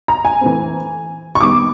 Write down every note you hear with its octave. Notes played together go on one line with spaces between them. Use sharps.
A#5
G#5
E3 A3 C4
C#6
D#3 G3 B3 D6